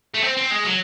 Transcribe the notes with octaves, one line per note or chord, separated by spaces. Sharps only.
A3
C4
C4
G#3
F#3